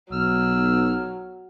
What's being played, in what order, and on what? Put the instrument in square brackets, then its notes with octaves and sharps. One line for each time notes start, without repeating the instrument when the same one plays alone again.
[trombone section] B1 [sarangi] F#3 [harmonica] E6 F6